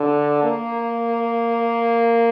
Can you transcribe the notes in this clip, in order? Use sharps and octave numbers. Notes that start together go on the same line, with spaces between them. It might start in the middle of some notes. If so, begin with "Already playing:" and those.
Already playing: D3
A#3